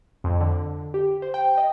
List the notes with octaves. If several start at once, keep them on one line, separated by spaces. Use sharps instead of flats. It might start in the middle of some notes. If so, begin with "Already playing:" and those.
F2
D3
G4
C5
G5
D#5